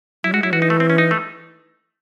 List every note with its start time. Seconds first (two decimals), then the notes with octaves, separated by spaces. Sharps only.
0.24 F#3 E4
0.33 G#3 F#4
0.43 F#3 E4
0.52 E3 F#4
0.62 D#4
0.70 A3
0.80 C4
0.90 C#4
0.98 D#4
1.11 A3